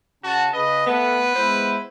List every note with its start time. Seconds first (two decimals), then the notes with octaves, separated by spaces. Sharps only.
0.24 C#3 F#4 A5
0.54 C#3 B4 D#5
0.87 A3 B3 A4 B4
1.35 G#3 B3 E4 C5